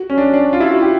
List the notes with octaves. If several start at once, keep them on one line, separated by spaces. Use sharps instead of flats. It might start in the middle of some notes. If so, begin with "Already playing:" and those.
Already playing: F#4
C#4
D4
D4
F4
E4
F#4
G4